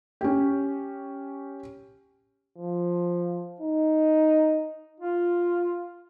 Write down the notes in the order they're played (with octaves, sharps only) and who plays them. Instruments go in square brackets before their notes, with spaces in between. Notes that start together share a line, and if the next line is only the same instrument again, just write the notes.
[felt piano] C#4 G4
[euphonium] F3
D#4
[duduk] F4